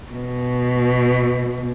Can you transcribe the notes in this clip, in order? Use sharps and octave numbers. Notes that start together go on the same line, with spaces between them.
B2